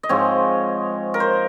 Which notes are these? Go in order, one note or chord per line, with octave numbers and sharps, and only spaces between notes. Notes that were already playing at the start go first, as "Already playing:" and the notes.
D#5
G#2 F3 G#3 C4 C#5
A#4
C5